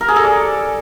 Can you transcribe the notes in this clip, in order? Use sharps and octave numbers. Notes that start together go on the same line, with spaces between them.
A#4
G#4
A4
D5